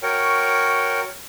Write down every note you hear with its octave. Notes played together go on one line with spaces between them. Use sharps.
F#4 A#4 C#5 G5 C#6